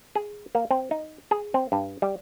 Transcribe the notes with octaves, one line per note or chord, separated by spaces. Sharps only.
G#4
A#3
C4
D#4
G#4
C4
G2
G3